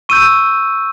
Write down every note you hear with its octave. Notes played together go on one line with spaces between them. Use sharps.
C#6 E6 G6 D#7